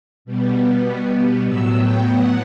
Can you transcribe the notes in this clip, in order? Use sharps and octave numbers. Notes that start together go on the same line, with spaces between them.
B2 G3 B3
A2 F#3 B3 E6
G5
F#5